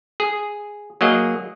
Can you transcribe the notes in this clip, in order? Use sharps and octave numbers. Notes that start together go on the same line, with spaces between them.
G#4
F#3 A#3 G#4 D#5